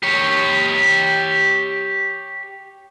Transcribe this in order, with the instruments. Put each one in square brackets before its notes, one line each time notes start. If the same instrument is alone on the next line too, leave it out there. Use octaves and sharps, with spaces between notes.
[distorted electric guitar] G4 C#5